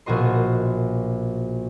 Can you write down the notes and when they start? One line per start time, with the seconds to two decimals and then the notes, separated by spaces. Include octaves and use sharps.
0.06 A#1 B2 F#4 D#5 C6